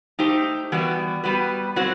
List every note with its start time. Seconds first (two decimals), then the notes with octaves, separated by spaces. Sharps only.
0.19 A3 D#4 G4 C5
0.72 E3 G3 B3 F#4
1.23 G3 B3 F#4 B4
1.76 B2 F#3 C4 F#4 C5